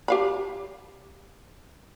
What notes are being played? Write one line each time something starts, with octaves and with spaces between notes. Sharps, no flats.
G4 F5 B5